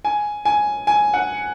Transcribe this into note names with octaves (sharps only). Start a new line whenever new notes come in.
G#5
G#5
G#5
F#5